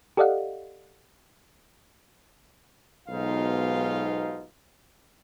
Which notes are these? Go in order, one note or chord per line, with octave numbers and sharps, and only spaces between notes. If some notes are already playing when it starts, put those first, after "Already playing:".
G4 A4 D5 D#5 F5 F#5
B1 G#2 B2 D#4 F4 F5